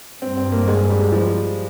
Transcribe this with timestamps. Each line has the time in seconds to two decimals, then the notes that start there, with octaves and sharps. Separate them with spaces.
0.22 G2 C4
0.37 C4
0.52 A#3
0.67 G#3
0.90 G3
1.12 F3